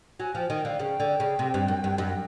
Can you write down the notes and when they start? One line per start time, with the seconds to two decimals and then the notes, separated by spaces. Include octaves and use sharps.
0.20 F#3 G#5
0.35 F3 G5
0.50 D#3 G5
0.65 D3 F5
0.79 C#3 G5
1.00 D3
1.20 C#3
1.39 C3
1.54 G2
1.68 F#2
1.84 G2
1.98 F#2 G5